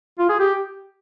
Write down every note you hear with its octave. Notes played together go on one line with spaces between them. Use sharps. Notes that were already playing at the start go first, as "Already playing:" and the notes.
F4
G#4
G4